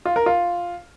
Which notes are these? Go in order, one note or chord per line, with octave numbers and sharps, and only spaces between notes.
F4
A#4
F4